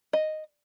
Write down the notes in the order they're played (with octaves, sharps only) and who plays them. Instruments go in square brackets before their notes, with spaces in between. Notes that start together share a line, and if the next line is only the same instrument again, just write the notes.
[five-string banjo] D#5